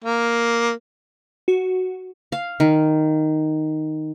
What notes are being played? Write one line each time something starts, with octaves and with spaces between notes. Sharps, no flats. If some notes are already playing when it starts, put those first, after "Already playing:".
A#3
F#4
F5
D#3